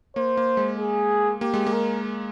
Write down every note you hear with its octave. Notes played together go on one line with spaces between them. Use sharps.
A#3 C5
A#3
G#3
G#4
A#3 G4
G#3
A#3
A#4